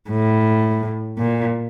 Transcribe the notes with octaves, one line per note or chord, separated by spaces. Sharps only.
A2
A#2